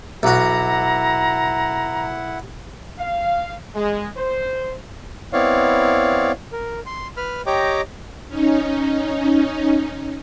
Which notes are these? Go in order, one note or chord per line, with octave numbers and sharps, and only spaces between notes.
B1 E4 F#4 F#5 A#5
F5
G#3
C5
B3 C4 E4 C#5 D5 F5
A#4
C6
B4 B5 F6
G4 C#5 D#5 G5 A#5 D6
C#4 D#4